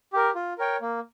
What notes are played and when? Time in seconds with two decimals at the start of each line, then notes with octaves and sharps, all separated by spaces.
0.13 G4 A#4
0.35 F4
0.58 A#4 C#5 G5
0.81 A#3